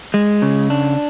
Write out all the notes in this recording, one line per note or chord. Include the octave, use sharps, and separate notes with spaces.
G#3
C#3
D4